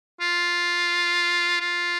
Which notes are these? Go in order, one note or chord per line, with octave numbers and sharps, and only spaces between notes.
F4
F4